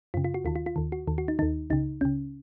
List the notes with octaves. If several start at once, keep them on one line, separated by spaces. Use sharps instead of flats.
F#2 C#3 F4
F4
F#4
D#2 D#3 F4
F4
F4
D#2 D#3
F#4
D#2 D#3
F#4
D#4
D#2 D#3 D#4
C#2 C#3 D#4
C#2 C#3 C#4